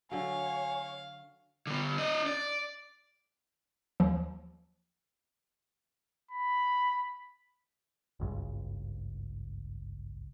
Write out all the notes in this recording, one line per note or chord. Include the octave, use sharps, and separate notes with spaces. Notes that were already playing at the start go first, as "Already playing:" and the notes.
D3 F#3 C#5 F5 G#5
D3 B3
D4 D#5
D5
D#2 F3 F#3
B5
G#1 C#2 G2